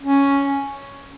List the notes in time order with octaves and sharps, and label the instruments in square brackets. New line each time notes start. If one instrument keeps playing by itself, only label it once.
[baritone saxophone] C#4